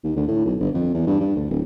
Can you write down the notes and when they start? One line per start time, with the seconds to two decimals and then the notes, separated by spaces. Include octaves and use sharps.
0.04 D#2
0.16 D2
0.28 A2
0.46 B1
0.60 G1
0.74 F2
0.94 E2
1.07 G2
1.20 G2
1.36 D2
1.50 D1